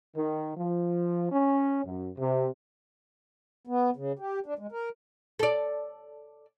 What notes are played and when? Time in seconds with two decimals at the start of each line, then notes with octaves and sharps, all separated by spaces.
0.17 D#3
0.56 F3
1.32 C#4
1.84 F#2
2.17 C3
3.67 B3
3.96 C#3
4.19 G4
4.46 D4
4.59 G#3
4.72 A#4
5.39 A4 D5